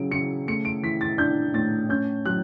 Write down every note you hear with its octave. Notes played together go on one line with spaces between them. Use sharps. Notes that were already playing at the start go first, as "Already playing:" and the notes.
Already playing: C#3 F#3 D7
C#3 C#7
A3 C#7
D7
E3 B6
A6
D4 G6
A2 A6
C#4 G6
F#3 F#6